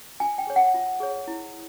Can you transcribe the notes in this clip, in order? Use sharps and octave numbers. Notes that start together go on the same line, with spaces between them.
F4 G#5
G5
G#4 C#5
F#5
F4
G#4 C#5
E4